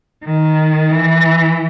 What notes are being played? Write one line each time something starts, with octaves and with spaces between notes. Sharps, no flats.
D#3
E3